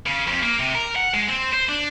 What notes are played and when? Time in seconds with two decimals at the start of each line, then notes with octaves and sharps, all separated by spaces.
0.07 C#3
0.28 F2
0.43 A#3
0.60 C3
0.75 A#4
0.96 F#5
1.14 G#3
1.29 C4
1.53 C5
1.69 D4